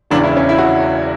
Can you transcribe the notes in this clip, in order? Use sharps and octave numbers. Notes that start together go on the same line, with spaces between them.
E1 E2 C#3 E3 D4
E4
C#4
E4
F#4